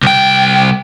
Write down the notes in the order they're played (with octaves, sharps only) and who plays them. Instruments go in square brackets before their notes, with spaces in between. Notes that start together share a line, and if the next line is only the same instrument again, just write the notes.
[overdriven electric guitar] C2 G5